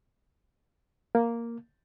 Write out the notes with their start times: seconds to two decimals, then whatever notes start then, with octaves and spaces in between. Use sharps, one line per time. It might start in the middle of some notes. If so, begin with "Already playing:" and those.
1.15 A#3